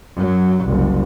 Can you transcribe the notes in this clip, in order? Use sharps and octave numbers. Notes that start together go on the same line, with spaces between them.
F#2 F#3
F#1 C2